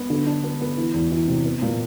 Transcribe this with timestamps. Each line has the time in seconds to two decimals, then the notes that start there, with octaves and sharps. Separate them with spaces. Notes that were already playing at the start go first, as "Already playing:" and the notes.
Already playing: B3
0.10 D3
0.27 D4
0.44 B3
0.61 B3
0.77 E3
0.94 E2
1.12 E3
1.28 C3
1.45 B3
1.62 A#2